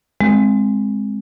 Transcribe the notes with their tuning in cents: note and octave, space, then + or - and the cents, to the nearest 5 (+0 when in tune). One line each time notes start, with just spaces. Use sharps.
G#3 +0 C4 +5